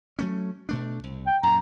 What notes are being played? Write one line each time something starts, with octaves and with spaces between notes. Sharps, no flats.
F#3 A3 C#4
B2 A3 D4
C2
G5
F#2 A#2 A#5